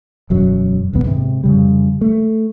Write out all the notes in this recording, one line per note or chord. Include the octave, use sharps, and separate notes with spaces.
E1 F#2 F#3
D#1 A#1 D#2 B3
G#2 C3
F2 C#3 G3
A3